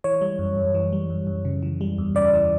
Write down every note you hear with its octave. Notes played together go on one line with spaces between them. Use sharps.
E3 C#5
G3
F#2
F#2
E3
G3
F#2
F#2
C#3
E3
G3
E2
C#3 D5
E3